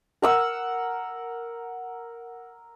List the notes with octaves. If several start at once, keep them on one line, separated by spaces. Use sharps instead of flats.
A#4 F#5 E6